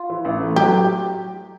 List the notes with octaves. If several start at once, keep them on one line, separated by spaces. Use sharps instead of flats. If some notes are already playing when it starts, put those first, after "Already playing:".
Already playing: F4
E3
A1
A3
F#3 G4